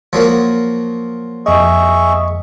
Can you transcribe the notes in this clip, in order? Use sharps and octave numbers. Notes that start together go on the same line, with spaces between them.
F3 F#3 A#3
F2 G#4 D#5 E5 C#6